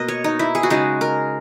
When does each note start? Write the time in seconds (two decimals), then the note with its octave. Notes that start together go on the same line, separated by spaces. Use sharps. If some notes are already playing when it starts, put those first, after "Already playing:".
Already playing: B2 A#3 A#4 D#5
0.08 C#5
0.24 D#4
0.39 E4
0.55 G#4
0.63 F#4
0.70 C#3 G#3 D#4 G#4
1.01 A#4